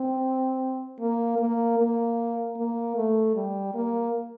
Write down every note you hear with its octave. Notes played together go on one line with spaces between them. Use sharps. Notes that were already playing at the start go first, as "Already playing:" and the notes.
Already playing: C4
A#3
A#3
A#3
A#3
A3
G3
A#3